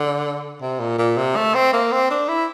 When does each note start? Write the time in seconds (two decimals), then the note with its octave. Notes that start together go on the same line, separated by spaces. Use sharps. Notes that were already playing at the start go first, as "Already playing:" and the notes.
Already playing: D3
0.62 C3
0.80 A#2
0.98 A#2
1.17 C3
1.36 A3
1.54 C4
1.73 A#3
1.92 C4
2.11 D4
2.28 E4